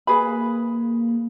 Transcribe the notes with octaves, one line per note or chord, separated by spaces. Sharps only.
A#3 G#4 B4 B5